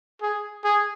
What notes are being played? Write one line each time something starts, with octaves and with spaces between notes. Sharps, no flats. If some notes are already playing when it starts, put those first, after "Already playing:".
G#4
G#4